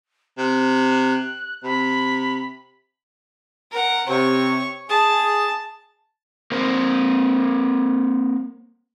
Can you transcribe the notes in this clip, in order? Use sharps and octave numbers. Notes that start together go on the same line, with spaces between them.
C3 F#6
C3 B5
A#4 F#5
C3 C#5 C#6
G#4 A5
A#3 C4 A#4 C5